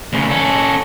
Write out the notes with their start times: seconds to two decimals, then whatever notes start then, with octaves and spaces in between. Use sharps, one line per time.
0.13 D2 C#3
0.29 C#4 A4